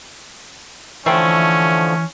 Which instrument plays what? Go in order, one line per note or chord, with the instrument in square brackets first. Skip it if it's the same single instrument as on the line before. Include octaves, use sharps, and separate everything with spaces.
[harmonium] D3 F3 [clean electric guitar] E3 B5 [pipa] A3 C5 G5 [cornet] C#4